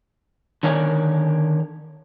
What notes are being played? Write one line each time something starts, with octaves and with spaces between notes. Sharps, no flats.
D3 D#3 A#4 C#5 D5 G#5